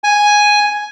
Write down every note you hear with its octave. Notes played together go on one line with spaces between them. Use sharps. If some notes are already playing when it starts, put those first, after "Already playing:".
G#5